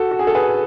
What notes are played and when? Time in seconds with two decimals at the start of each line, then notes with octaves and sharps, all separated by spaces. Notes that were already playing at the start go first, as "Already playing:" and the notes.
Already playing: F#4 A4
0.11 F#4
0.19 G#4
0.27 A4
0.35 G#4 B4